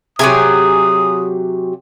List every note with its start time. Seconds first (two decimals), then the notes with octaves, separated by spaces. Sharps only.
0.19 C3 F#3 G4 G#4 G#5 D#6